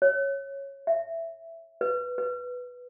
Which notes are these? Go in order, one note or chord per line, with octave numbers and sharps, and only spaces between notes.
C#5
E5
B4
B4